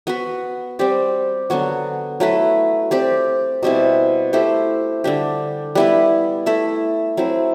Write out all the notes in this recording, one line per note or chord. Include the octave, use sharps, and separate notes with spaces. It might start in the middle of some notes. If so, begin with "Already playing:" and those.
B3 F#4 B4
G3 C4 G4 D5
D3 F#3 B3 F#4
F#3 A3 E4 B4
C4 G4 D5
B2 G3 C4 E4
A3 E4 G4 C5
D3 G3 D4 G4
G3 B3 E4 B4
A3 E4 A4 E5
F#3 C4 E4